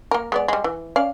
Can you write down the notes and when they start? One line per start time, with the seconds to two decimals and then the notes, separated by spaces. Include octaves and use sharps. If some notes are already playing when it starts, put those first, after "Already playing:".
0.11 A#3 A#4
0.32 G#3 B3 D5
0.48 G3 G#3
0.64 E3
0.96 C#4 D5 F5